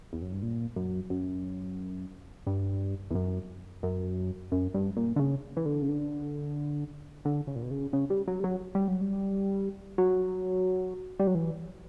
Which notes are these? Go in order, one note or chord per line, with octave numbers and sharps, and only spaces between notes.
E2
F#2
G2
A#2
F#2
F#2
G2
E2
F#2
F#2
F#2
G2
A#2
D3
C#3
E3
D3
C#3
D3
D3
C#3
A#2
B2
C#3
C#3
G3
F#3
G3
F#3
G3
F#3
G3
F#3
G3
F#3
E3